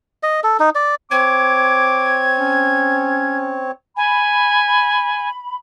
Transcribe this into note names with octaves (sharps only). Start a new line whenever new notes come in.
D#5
A4
D#4
D5
C4 C#5 D6 G#6
C#4
G#5 B5